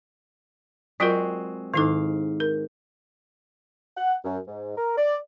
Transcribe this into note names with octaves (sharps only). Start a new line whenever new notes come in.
F#3 G#3 C4 F4 F#4 A#4
G#2 D#3 E4 A4 F5
A#4
F#5
F#2
G#2
A#4
D5